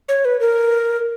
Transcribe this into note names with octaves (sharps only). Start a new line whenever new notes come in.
C#5
B4
A#4